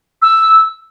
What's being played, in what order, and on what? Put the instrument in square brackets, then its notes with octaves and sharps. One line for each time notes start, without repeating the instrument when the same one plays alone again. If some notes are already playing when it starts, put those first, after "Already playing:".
[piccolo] E6